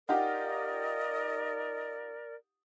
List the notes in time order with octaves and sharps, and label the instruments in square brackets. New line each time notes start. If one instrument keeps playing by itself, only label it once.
[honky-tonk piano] D#4 F4 G4 [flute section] A#4 D5 [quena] D#5 [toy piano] F#5